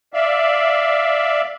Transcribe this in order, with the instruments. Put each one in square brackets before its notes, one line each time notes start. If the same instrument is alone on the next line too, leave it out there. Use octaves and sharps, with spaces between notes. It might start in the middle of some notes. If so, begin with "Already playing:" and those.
[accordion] D5 E5 F5